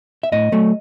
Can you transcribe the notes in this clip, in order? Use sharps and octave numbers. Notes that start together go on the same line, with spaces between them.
E5
A2 D#5
F#3 A3